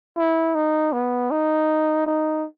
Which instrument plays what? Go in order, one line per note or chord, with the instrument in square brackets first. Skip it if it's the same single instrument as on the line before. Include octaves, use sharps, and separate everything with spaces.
[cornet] E4
D#4
B3
D#4
D#4